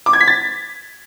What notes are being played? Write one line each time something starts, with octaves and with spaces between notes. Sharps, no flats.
D6
G#6
B6
A6